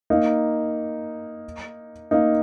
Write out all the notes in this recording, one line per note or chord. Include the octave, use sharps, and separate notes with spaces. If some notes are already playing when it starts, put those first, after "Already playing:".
A#3 D#4
A#3 D#4